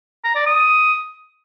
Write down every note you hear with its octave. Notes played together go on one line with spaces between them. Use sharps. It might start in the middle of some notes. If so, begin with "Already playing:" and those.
A#5
D5
D#6